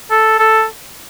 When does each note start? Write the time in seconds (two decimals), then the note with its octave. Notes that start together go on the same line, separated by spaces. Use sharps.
0.11 A4
0.39 A4